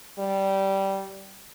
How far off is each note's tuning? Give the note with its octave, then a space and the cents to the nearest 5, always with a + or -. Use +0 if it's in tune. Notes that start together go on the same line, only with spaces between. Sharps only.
G3 -15